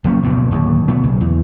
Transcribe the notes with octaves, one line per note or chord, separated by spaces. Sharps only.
F#1 F3 A#3 C#4
D2 G2 B2
D1 D#2
B2 A3
B1 C#3
E2